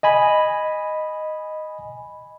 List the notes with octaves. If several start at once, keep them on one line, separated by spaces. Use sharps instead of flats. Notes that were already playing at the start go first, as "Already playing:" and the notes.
D#5 G#5 B5